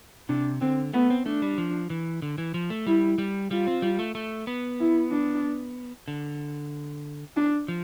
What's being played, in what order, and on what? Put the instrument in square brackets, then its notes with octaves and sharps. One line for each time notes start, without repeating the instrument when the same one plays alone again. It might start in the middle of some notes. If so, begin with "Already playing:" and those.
[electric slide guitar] C3 [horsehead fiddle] D4
[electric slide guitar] D3 [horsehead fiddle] C4
[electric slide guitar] A3 [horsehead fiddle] B3
[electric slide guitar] C4
[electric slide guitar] A3 [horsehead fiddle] D4
[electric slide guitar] G3
F3
E3
D3
E3
F3
A3
[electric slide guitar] G3 [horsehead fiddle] E4
[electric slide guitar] G3
[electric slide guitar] G3 [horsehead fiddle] F4
[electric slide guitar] C4
G3
A3
A3
B3
[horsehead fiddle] E4
D4
[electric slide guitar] D3
[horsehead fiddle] D4
[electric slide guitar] F3